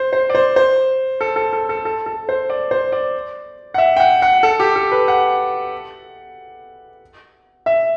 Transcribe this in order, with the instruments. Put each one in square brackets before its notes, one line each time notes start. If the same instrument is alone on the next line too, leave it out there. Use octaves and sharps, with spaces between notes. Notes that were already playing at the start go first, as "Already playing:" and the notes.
Already playing: [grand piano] C5
C5
D5
C5
C5
A4
A4
A4
A4
A4
A4
C5
D5
C5
D5
F#5
E5
G5
F#5
F#5
A4
G4
A4
B4
F#5
E5